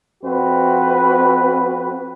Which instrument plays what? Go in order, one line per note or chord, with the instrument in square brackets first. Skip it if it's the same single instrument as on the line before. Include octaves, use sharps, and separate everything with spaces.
[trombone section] F2 C4 F#4 B4